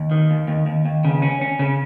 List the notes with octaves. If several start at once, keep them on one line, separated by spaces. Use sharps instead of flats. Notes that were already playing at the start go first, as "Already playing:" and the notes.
Already playing: D#2
D#3
D#2
D#2
D#2
D#2
C#3
C#4
C#4
C#3